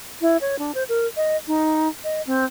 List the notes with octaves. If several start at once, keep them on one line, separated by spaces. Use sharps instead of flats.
E4
C#5
D4
C5
A#4
D#5
D#4
D#5
C4